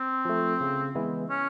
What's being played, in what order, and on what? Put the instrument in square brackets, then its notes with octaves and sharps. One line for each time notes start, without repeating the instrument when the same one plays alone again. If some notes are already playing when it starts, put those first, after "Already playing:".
Already playing: [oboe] C4
[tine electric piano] F3 A3
C#3
E3 G#3 B3 E4
[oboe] C#4